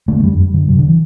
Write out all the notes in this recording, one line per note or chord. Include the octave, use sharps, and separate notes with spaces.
D3 A3
A3
F#2 G3
F#2 G3
D3
C3 F#3
D3
E3